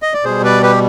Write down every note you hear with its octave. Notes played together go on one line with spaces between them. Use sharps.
D#5
D5
B2 G3 G#4 C5
B4 D5
G4 B4